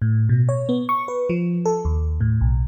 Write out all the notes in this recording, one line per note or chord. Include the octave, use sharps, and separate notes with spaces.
A2
B2
C#5
B3
C#6
B4
F3
A4
D#2
A2
B1